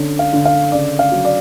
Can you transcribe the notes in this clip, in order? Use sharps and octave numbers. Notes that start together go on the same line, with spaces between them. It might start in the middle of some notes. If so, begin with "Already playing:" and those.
Already playing: D3 C#4
F5
D3
F5
C#3 D5
F5
F#3
D5